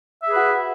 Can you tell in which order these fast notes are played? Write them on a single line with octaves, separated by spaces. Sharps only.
E5 G#4 B4 F#4